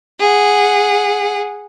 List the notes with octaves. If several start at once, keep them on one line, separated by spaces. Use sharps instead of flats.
G#4 F#5